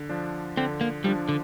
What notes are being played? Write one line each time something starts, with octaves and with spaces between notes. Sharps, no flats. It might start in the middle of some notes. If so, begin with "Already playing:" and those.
Already playing: D3
F3 D4
D3 C4
A#3
F3 G3 D4
D3